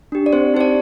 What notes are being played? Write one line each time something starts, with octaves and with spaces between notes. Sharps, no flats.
D4 G4
D5
C4 C5
D#4 G4 C5
D5